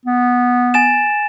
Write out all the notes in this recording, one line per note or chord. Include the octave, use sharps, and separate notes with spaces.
B3
G#5 A6 E7